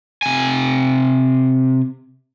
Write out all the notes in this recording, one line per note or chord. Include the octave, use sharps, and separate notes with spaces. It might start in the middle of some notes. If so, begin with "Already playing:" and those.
C3 G#5